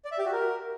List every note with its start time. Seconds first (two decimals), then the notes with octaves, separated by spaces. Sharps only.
0.05 D5
0.12 E5
0.18 G4
0.25 F#4
0.32 A#4